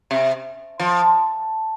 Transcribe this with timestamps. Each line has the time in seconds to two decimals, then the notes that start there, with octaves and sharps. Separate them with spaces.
0.11 C3
0.80 F3